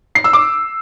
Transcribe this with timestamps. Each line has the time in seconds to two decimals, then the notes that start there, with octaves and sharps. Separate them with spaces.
0.15 C7
0.24 E6
0.33 D6